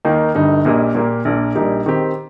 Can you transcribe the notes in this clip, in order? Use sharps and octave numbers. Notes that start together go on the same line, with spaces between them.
D#2 D#3 A#3 D#4
G1 G2 G3 D#4
A#1 A#2 A#3 G4 D#5
A#2 A#3 G4
A#1 A#2 A#3
A#1 A#2 G3 D#4 G4
D#3 C4 G4